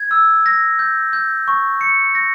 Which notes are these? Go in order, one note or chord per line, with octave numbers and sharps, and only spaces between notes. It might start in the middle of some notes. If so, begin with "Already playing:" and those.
Already playing: G#6
E6
A#6
G6
G6
C#6
C#7
A#6